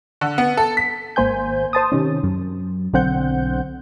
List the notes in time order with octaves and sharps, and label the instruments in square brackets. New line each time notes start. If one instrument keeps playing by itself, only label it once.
[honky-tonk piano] D3
B3
A4
B6
[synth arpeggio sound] G#1 A#3 C5 G#5 G6
C5 A5 D#6
C3 D#3 C#4
F#2
B1 D3 C4 F#5 G6